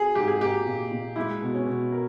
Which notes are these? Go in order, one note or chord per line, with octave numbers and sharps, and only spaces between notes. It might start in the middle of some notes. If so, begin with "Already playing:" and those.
Already playing: G#4
G#2 G4
G#4
A#3 G4
A#2
A#2
G#3 E4
B2
C#4
B2
A#4